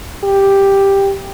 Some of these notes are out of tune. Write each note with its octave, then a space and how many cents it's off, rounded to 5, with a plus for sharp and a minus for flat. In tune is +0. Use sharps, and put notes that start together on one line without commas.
G4 +5